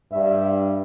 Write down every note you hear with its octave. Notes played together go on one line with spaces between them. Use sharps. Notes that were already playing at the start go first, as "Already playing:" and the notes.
G2 E5